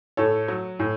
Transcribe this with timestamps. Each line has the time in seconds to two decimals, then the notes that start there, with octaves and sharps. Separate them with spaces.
0.17 A2 A4 C#5
0.48 F#3
0.79 A2